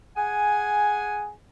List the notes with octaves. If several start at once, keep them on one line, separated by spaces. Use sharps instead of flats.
G#4 F#5 G#5